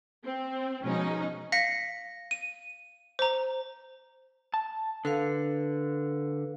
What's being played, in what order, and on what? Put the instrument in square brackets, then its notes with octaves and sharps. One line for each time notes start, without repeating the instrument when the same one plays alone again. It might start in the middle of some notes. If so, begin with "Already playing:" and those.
[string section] C4
B2 F3 G#3 C#4 D#4
[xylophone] F5 A#6 B6 C#7
D#7
C5 A#5
[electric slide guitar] A5
[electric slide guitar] D3 [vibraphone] A4 B4 F5